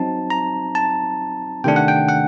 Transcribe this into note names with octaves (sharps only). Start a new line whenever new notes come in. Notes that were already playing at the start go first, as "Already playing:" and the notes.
Already playing: F#3 C4 D#4 A5
A#5
A5
C3 D#3 A3 D4 G5
F#5
G5
F#5